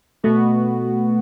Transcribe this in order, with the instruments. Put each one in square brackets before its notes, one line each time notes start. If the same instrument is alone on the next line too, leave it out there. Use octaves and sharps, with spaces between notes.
[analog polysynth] B2 B3 F#4 [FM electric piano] A3